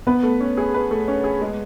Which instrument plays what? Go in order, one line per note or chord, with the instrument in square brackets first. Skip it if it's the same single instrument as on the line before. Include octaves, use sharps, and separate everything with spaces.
[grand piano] B3 [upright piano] B4
[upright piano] A3
C#4
G#4
B4
A3
C#4
G#4
G#3